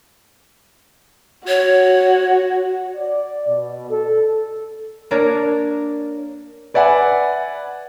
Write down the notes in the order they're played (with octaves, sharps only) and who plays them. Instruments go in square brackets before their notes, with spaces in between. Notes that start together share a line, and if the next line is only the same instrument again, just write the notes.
[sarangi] F#4 [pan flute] C#5
[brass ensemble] D5
B2
A4
[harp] A#3 D4 A#4 C#5 D5
[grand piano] B4 D5 E5 F#5 G#5 B5